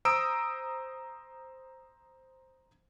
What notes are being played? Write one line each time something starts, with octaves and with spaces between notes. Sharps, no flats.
C5 A#5 D#6 E6 D7